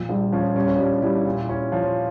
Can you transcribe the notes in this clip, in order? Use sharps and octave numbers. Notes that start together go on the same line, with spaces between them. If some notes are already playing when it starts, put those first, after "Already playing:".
Already playing: A#2 F3
A#1 G3
F3 C#4
G3 C#4
C#4
G3 D4
G3 E4
A#2 E4
C#4 E4
F3 C#5